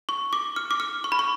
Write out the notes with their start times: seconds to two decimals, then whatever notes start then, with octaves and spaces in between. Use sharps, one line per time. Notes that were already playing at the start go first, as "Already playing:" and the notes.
0.09 C#6
0.33 D6
0.56 F6
0.71 D6
0.80 F6
1.04 C#6
1.12 B5
1.19 C#6